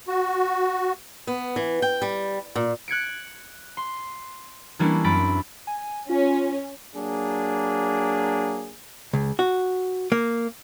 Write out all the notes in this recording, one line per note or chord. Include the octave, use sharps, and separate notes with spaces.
F#4
B3
E3
G5
G3
A#2
F#6 G#6 C#7 D7
C6
E3 G3 A#3 C#4 D4 E4
F#2 C4 B5 A6 D7
G#5
C#4 F4
F#3 A#3 D4 G#4
C#2
F#4
A#3